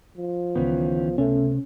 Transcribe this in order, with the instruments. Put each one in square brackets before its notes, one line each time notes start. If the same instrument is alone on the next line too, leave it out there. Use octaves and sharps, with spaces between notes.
[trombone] F3
[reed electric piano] C#2 B3 [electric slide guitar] D#3 E3 C#4
[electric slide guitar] C3 [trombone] A3 [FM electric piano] C#4